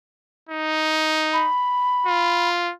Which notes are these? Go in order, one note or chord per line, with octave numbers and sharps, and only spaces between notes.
D#4
B5
F4